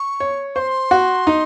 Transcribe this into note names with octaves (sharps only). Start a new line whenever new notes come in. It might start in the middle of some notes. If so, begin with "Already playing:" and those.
Already playing: C#6
C#5
C5 C6 C#6
F#4
D#4